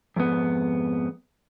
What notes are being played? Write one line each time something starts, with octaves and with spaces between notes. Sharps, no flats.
F2 G#2 B3